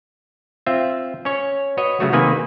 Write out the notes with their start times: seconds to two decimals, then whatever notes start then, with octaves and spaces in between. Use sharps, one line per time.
0.67 C4 F4 E5
1.25 C#4 C#5
1.77 F#4 B4 C#5 D#5
2.00 C#3 F#3 A3 F#4
2.13 C3 D#3 A#3 B4 G#5